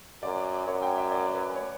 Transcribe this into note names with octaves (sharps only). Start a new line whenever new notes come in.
F#2 D5
F#2 C#5
G5
E5
D5
B4
C#5